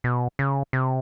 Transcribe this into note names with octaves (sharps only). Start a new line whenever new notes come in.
B2
C#3
C3